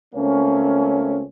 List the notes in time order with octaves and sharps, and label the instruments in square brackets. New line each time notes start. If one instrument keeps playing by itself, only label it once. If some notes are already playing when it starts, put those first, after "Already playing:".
[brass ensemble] C#2 A3 A#3 C4 C#4